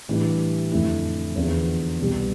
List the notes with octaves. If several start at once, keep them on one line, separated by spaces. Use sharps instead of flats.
A2 E3 G3 D4 G4
F2 D3 A3 E4
E2 D3 F3 B3
C2 B2 G3 B3